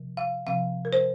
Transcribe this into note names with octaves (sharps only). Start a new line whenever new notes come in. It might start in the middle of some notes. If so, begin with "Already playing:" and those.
Already playing: C3 F3
F5
C3 F3 C4 F5
A#4
C5